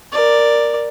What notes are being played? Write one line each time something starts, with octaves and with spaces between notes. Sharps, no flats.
A#4 D5